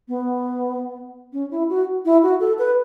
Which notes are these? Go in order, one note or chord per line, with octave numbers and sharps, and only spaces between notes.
B3
C#4
E4
F#4
E4
F#4
A4
B4